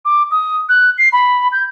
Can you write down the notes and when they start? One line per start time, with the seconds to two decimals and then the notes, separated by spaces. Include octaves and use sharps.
0.05 D6
0.31 D#6
0.69 F#6
0.98 C7
1.12 B5
1.52 G6